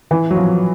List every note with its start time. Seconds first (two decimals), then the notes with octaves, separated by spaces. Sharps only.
0.11 E3
0.30 F#3
0.36 F3